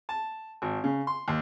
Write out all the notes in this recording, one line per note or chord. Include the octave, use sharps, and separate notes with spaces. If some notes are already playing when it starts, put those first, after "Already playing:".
A5
G#1
C#3
C6
D#2